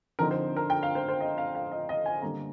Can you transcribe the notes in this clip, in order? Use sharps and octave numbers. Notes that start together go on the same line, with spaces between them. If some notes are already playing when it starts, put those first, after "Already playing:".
D3 F3 C4 D#4 A#4
C5
A#4
G5
F5
C5
C5
D#5
F5
F5
D#5
D#5
G#5
D3 G3 A#3 A#5